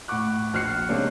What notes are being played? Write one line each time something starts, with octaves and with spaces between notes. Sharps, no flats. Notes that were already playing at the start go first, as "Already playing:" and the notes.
A2 F#5 C#6 D6 F#6
A#1 F#4 F6 F#6 C7 C#7
C3 G#3 A#3 C#4 D4